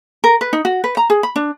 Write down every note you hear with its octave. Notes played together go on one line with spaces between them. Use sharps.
A#4
B4
D#4
F#4
B4
A#5
G#4
B5
D4